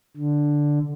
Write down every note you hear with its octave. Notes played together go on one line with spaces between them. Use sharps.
D3